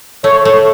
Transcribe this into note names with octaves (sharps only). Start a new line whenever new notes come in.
A3 C#5
A3